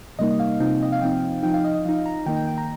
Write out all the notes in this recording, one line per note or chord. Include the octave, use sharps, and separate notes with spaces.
C3 G3 A#3 D#4 D#5
D#5
F5
F5
C3 F3 C4 D#4 G5
D#5
F5
F3 C4 D#4 G5
F3 D#4 G5
F5
D#5
D#5
F3 D#4 F5
A#5
D#3 A#3 D#4 G5
G5
G5
A#5